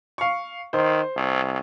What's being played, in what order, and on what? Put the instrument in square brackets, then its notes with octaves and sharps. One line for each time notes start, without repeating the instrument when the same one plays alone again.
[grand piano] F5 C#6
[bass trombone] D#3 [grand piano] C5
[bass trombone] C2